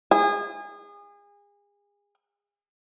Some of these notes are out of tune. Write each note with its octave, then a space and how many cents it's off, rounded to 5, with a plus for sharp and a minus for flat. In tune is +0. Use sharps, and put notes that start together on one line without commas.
G#4 -30